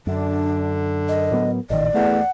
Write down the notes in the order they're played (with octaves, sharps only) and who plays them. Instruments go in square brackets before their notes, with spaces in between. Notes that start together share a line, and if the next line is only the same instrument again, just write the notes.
[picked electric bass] F#2 [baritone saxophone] D3 [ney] D4
[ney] A#4 [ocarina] D#5
[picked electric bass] A2 F#3 B3
[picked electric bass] A1 A#2 D#3 [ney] D5 [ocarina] D#5
[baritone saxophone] E2 [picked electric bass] A3 [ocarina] F#5